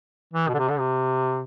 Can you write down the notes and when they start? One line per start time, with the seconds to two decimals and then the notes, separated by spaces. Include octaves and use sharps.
0.34 E3
0.48 B2
0.54 D3
0.59 C3
0.69 D3
0.79 C3